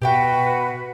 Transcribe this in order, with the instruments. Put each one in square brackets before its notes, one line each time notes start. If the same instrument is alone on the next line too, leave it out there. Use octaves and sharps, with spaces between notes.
[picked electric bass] B2 [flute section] F#4 B4 [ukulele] G4 E5 G5